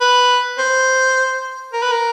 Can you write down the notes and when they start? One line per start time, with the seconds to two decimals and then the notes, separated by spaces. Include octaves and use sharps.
0.01 B4
0.59 C5
1.73 A#4
1.82 B4
1.92 A#4